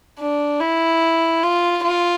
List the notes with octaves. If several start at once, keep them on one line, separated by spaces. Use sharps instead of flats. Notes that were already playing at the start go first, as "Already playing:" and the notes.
D4
E4
F4
F4